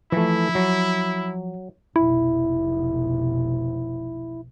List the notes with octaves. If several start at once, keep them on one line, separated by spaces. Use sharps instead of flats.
E3 F3 A3 E4
F#3
F1 B1 E4